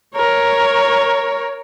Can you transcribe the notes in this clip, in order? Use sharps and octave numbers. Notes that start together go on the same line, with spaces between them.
A#4 C#5